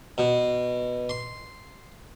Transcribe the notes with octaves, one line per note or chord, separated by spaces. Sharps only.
B2
C6